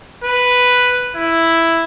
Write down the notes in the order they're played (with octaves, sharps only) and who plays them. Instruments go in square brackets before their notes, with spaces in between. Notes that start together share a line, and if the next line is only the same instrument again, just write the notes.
[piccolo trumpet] B4
E4